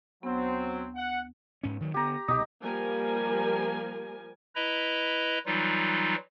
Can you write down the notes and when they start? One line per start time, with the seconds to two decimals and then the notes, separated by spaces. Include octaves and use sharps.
0.23 D2 F#3 B3 C4
0.95 F#5
1.63 G#2 C#4
1.79 D2 D#3 F#3
1.94 D3 B3 G4 A#5
2.28 C2 B2 D#4 G4
2.63 F3 G3 A#3 A#4 G#5
4.55 E4 B4 D#5 A#5
5.46 E3 F#3 G3 D#4 F4